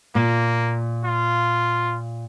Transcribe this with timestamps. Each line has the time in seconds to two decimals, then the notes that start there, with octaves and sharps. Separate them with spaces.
0.15 A#2 A#3
1.04 F4